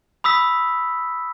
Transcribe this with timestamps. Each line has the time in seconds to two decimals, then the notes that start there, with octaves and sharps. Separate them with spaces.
0.24 B5 D#6 E6 B6